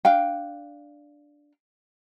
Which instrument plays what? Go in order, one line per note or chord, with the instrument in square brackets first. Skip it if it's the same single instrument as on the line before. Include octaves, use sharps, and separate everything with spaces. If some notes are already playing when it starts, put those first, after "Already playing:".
[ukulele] D4 F5 G5